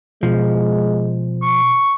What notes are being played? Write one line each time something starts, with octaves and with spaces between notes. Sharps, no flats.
B2 F3 G#3
C#6